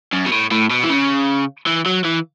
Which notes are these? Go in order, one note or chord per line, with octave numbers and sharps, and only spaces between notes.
F#2
B2
A2
A2
B2
E3
C#3
E3
F#3
E3